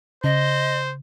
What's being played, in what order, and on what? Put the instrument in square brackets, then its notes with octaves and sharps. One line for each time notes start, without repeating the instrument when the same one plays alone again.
[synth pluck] C#3 [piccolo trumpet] C5 [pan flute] D#5